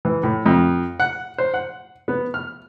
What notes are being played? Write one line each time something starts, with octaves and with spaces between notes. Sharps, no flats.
E3
A2
F2
F#5
C5
F#5
B3
F6